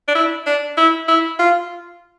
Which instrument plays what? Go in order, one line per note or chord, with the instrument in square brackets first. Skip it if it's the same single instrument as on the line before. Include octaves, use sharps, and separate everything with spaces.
[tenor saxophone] D4
E4
D4
E4
E4
F4